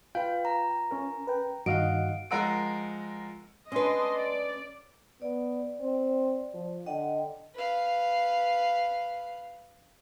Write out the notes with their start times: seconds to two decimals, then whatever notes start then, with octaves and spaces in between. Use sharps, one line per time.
0.15 F4 B4 F5 G5
0.45 A#5
0.91 C#4 A#4
1.27 B4 G5
1.66 G2 D#3 F#4 D#5 F5 F#5 D7
2.31 F3 G#3 A#4 F#5 E6 D7
3.72 C#4 D4 B4 D#5 C6
4.16 D5
5.22 B3 D5
5.81 C4
6.54 F3
6.86 D3 D#5 F#5 G5
7.54 B4 F5